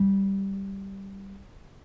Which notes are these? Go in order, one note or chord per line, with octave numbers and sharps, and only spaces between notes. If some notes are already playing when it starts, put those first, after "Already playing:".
Already playing: G3